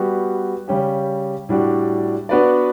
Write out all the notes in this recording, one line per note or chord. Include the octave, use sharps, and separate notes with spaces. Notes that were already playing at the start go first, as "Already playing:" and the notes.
Already playing: G3 B3 F#4
C#3 G3 C#4 G4
A2 G3 D4 F#4
B3 D4 F#4 B4 D5